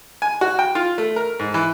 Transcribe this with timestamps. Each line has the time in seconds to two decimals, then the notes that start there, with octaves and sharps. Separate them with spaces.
0.22 G#5
0.41 F#4
0.59 G5
0.75 F4
0.98 A3
1.16 A#4
1.39 G#2
1.54 E3